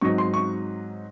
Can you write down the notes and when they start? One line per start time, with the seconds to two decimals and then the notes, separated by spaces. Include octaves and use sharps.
0.01 G#2 F#3 C4 D#4 C#6
0.18 C6
0.34 C#6